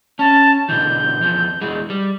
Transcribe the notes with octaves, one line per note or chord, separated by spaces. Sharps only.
C#4 A5
B2 D3 E3 G6
E2 F3
E2 E3 G#3
G3